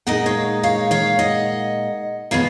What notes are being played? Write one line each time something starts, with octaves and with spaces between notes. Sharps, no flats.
A#2 G#3 D#4 D#5 F#5
C#5 F5
C#5 F5
C#5 F5
D#5 F#5
B2 G#3 B3 C#5 F5